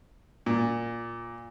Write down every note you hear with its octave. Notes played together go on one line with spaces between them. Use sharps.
A#2